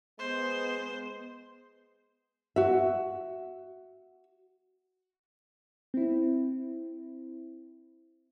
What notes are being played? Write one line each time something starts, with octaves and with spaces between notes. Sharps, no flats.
G#3 B3 C5
F#4 E5
C4 E4